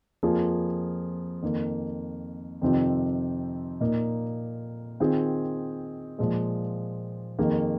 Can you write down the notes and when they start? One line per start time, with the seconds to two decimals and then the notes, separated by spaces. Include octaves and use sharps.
0.23 F2 F3 A#3 F4 G#4
1.42 F2 D#3 A#3
2.62 F2 C3 D#3 C4 F4
3.81 A#2 A#3 D#4
5.00 D#3 C4 F4 G#4
6.19 A#2 F3 G#3
7.39 F2 D#3 A#3 G#4